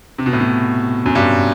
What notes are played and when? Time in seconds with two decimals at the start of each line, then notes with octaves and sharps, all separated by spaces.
0.18 C3
0.26 B2
0.33 A2
0.40 B2
1.06 F#2
1.15 G2